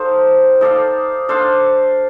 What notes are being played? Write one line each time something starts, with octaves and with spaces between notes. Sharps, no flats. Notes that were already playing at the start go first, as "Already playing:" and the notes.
Already playing: D#4 G4 A4 C5 F5
D#4 A4 D5 F5
D4 A4 C5 F5